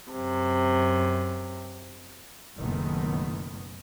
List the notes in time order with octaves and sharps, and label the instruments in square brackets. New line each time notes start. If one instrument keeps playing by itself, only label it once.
[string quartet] F#2 C3
[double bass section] F#1 C#2 B2 D#3 A3 B3